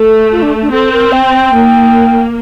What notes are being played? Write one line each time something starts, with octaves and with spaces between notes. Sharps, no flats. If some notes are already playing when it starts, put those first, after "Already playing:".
Already playing: A3 A4
F4
D4
D4
C4 A4
A#4
G5
A#3